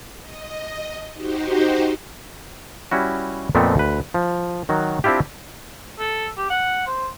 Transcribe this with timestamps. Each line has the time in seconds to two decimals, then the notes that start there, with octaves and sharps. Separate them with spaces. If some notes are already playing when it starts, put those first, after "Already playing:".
0.20 D#5
1.12 D#4 F#4 G4 C5
2.91 G3 C#4 E4 F#4
3.55 F2 A#2 A3 B3 C4
3.76 D2 B4
4.14 F3
4.69 D#3 F#3 F#4
5.04 C4 D4 E4 F4 G4
5.99 A4
6.37 G4
6.50 F#5
6.87 C5